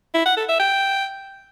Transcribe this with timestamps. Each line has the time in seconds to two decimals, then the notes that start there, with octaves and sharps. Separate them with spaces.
0.14 E4
0.26 F#5
0.37 A4
0.48 E5
0.60 G5